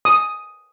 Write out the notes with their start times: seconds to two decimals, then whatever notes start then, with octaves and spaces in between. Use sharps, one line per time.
0.05 D#6